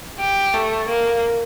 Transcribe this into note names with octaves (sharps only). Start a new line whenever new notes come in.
G4
A3
A#3